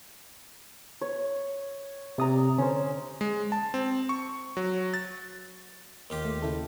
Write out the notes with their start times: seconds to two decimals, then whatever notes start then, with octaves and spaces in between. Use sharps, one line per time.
1.01 C#5
2.18 C3 D5 A#5 D#6
2.58 D3 C#4 C5
3.21 G#3
3.52 A5
3.74 C4
4.09 C#6
4.57 F#3
4.94 A6
6.10 D#2 F4 G4
6.25 A3
6.42 C#3 E4 A4